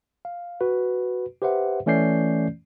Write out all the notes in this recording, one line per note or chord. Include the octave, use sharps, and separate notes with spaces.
F5
F#4 B4
G4 B4 C5 E5 F#5
E3 A3 C#4 D5 G6 C7